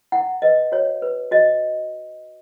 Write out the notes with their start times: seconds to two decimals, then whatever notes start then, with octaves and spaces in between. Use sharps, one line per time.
0.12 E4 F#5
0.42 B4 D#5
0.72 F#4 C#5
1.02 B4
1.31 F#4 D#5